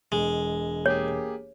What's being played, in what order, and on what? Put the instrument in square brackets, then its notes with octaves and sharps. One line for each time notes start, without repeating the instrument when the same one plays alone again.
[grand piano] E1 [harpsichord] G#3
[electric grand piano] A#3 G4 G#4 [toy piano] C#5